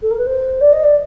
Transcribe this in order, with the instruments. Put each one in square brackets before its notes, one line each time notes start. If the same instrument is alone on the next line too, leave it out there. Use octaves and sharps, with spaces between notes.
[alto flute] A4
A#4
B4
C5
D5
D#5
D5